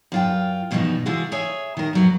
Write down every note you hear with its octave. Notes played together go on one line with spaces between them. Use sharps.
F#2 F4 G5
G2 B2 E3 F3 D#4
C3 E3 G#3 F4 F#4 G#4
G#4 C#5 E5 G#5
D#3 A#4
F2 F#3 B4